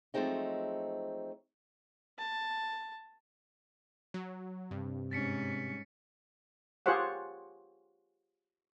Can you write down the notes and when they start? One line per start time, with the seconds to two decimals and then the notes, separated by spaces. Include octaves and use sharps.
0.14 F3 F#3 G#3 A3 C4 D#4
2.18 A5
4.14 F#3
4.71 G2 C3
5.11 G#2 C#4 A6 B6 C#7
6.86 F4 G4 G#4 C5 C#5 F#5